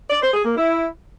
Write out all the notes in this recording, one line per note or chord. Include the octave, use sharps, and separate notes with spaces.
D5
C5
G#4
A#3
E4